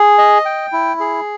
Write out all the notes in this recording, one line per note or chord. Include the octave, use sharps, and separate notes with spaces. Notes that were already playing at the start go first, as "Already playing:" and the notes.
Already playing: G#4
D#5
G5
E4
G#4